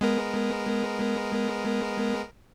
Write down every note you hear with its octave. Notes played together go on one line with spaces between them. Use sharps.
G#3 B3 A#4